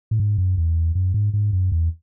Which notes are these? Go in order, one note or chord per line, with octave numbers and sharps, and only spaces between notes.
A2
G#2
F#2
E2
F#2
G#2
G#2
F#2
E2